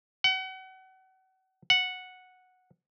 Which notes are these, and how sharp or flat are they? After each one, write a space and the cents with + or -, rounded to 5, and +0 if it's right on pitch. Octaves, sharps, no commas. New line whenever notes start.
F#5 +35
F#5 -5